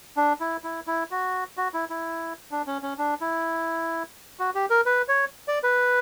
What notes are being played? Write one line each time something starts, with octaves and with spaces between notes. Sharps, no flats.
D4
E4
E4
E4
F#4
F#4
E4
E4
D4
C#4
C#4
D4
E4
F#4
G4
A#4
B4
C#5
D5
B4